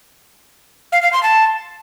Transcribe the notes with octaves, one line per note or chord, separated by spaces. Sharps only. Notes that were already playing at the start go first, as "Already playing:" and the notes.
F5
F5
C6
A5